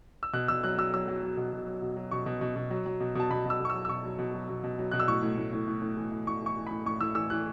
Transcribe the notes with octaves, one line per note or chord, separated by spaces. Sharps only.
E6
B2 F#6
B2 E6
F#3 F#6
F#3 E6
F#3 E6
F#3
F#3
B2
B2
F#3
B2
F#3
B2 C#6
B2
B2
B2
F#3
F#3
B2
B2 A5
B2 B5
B2 E6
B2 C#6
F#3 E6
E6
B2 C#6
F#3
B2
F#3
B2
B2
F#3
B2 F#6
E6
A2 C#6
A2
A2
A2
A2
A2
E3
A2
A2 C#6
E3 C#6
E3
A2 B5
A2 C#6
A2 E6
E3 E6
E3 F#6